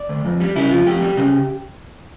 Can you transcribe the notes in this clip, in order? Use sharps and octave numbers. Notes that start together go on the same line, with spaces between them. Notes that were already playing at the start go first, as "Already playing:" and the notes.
Already playing: D5
D2
F2
G3
C#3 E4
F2 F4
F2 G4
G3
C#3